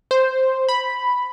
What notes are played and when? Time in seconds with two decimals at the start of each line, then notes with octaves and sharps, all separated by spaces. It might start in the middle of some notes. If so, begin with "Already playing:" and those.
0.11 C5
0.68 B5